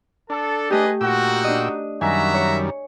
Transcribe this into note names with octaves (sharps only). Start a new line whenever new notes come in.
D4 A4
A3 G4 G#4 B4 D#5
A#2 D#4 F#4 G5 E6
D4 D#5
F#2 D#3 G3 F#4 E5 G#5 A#5
C#5